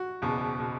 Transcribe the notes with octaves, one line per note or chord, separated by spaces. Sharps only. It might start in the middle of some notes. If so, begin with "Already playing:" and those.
Already playing: F#4
F#1 E2 B2
B2